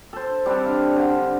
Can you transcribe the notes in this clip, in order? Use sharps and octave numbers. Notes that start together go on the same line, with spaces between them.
A4 C5
G3 C4 D4 A4
F5
D3